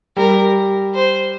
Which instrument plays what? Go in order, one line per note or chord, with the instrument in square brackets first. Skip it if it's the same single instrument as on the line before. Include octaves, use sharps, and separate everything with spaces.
[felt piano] G3 [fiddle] A#4
[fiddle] C5